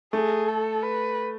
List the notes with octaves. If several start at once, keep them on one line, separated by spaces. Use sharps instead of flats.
A3 G#4
A4
B4